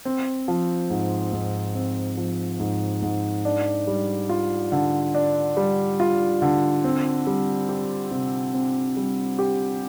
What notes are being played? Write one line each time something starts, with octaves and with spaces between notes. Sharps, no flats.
C4
F3
G#2
G#2
C4
F3
G#2
G#2
D4
G3
F4
D3
D4
G3
F4
D3
C4
G3
G4
C3
C4
G3
G4